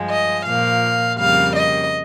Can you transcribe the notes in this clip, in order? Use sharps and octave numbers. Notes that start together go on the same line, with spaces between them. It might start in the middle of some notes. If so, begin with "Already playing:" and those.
Already playing: G2 F3 G#3
D#5
A#2 F3 A#3 F5
F2 C#3 G3 A#3 F5
D#5